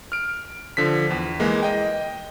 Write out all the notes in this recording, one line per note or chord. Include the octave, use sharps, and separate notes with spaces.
F6 D7
D3 F3 B6
E2
E3 G#3 A#3
D#5 G5